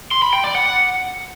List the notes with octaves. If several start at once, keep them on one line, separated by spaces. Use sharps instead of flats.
C6
B5
G5
D5
F#5